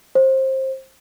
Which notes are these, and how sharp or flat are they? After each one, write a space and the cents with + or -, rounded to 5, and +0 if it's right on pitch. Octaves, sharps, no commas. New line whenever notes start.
C5 +20